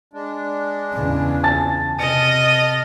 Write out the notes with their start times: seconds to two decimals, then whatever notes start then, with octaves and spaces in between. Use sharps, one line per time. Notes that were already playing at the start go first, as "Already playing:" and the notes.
0.13 G#3 D4
0.93 E2 C#3
1.43 G#5 A5 A6
1.99 C3 D#5 A5 F6 C#7